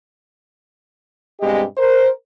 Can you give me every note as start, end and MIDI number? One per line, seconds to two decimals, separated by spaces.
1.41 1.63 43
1.41 1.63 47
1.41 1.63 56
1.41 1.63 60
1.41 1.63 67
1.41 1.63 75
1.78 2.09 70
1.78 2.09 72